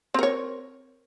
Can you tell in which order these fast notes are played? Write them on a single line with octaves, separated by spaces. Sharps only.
C4 A#4 C#5